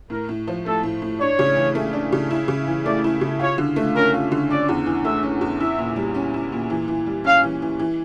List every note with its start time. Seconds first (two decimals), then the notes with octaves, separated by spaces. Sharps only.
0.10 A2 A#4
0.29 A2
0.47 F3
0.66 A3 A4
0.83 A2
1.02 A2
1.20 D4 C#5
1.39 C#3
1.57 E3
1.75 A3
1.93 D4
2.12 C#3
2.31 E4
2.48 C#3
2.67 E3
2.85 A3 D5
3.04 E4
3.21 C#3
3.40 F4 C#5
3.58 D3
3.76 A3
3.95 C#4 A#4
4.14 F4
4.32 D3
4.50 C#4 D5
4.69 E2
4.86 E3
5.05 A3 E5
5.23 C#4
5.41 E2
5.59 E4 E5
5.79 A#2
5.96 G3
6.14 C#4
6.34 E4
6.52 A#2
6.70 E3
6.88 E3
7.06 G3
7.24 C#4 F5
7.44 E3
7.62 E3
7.79 E3